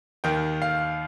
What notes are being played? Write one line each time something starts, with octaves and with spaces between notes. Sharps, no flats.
D#2 D#3 G5
F5